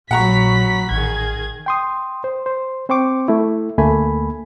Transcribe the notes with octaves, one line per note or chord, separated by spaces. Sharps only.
A#1 A#2 F#3 F#5 A#5 B5 C#6 B6
A1 D#3 G#4 G#6
G5 C6 D#6
C5
C5
C4 C5 G5 C#6 D6
A3 E4
D2 A3 A#3 G#5 B5